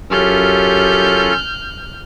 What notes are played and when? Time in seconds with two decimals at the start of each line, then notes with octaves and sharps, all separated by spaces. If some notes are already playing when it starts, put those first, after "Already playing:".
0.11 F#2 C#4 F4 G4 A4 F6 G6